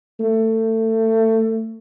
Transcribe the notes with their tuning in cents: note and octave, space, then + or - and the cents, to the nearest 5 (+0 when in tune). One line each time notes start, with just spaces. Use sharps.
A3 +25